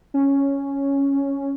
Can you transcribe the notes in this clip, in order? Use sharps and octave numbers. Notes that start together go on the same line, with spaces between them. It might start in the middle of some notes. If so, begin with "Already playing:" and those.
C#4